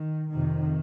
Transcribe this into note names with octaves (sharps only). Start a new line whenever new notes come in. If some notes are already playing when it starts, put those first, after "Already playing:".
Already playing: D#3
F2 C3 D#3